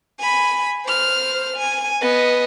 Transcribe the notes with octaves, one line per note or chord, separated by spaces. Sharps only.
G#5 B5
C5 F6
G#5
B3 D#5